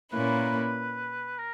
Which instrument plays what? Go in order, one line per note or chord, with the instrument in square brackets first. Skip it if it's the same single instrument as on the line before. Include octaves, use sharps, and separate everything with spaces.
[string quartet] A#2 A#3 C#4 E4 [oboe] B4
[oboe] A#4